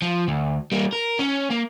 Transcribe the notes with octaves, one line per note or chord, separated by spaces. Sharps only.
F3
D2
G3 A#3
A#4
C#4
A#3